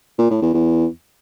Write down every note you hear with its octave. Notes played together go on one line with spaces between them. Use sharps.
A#2
A2
E2
E2